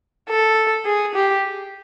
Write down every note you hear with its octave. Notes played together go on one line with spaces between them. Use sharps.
A4
G#4
G4